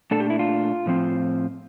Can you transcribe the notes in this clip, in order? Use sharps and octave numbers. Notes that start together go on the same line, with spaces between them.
A#2 A3 D4 A4
G4
E4
F4
A2 F3 C4